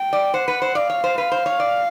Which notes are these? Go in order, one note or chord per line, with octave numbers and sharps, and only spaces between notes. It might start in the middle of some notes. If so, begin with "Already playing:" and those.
Already playing: G5
D5
C5 F#5
B4
C5
D5 F5
C#5
C5
B4 F5
C5
C#5
D5